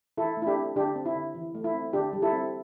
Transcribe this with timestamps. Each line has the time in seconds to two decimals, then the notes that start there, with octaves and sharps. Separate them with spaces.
0.18 E3 E4 A4
0.37 A3
0.42 E4
0.47 D4 G4
0.56 C4
0.76 D3 D4 G4
0.96 C4
1.05 E4
1.15 D3
1.35 E3
1.55 A3
1.64 E4
1.74 C4
1.93 D3 D4 G4
2.13 G3
2.22 E4 A4
2.32 C4